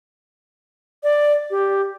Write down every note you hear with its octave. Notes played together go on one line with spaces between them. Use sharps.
D5
G4